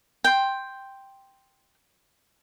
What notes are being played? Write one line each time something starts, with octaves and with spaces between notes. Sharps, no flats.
G5 C6